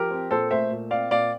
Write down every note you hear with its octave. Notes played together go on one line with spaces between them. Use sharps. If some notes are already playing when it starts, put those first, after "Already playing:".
Already playing: F3 G4 A#4
C4
A#2 A4 C5
A3 C5 E5
A#2
C4 D5 F5
A#2 D5 F5